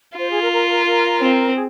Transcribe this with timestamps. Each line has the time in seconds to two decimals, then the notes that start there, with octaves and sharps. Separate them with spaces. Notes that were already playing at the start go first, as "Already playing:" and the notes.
0.18 F4 C5
0.30 G#4
0.40 A#4
0.52 A#4
0.69 A#4
0.85 A#4
1.20 C4
1.54 G#4